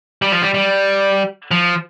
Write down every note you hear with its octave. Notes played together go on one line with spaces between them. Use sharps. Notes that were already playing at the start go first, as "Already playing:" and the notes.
G3
F3
G3
G3
F3